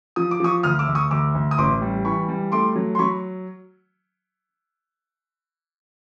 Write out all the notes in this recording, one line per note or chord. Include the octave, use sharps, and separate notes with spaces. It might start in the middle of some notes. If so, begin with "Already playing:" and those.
F3 D#6
D6
F3 C#6 D#6
D2 D#6 F6
D6 E6
D2
C#6 D#6
D2 D6 E6
D2
D#6
A1 C6 D6
G3
E3 B5 C#6
G3
A3 C6 D6
F#3
C6
F#3 B5 C#6